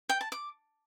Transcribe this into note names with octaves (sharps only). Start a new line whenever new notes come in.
G5
A5
D6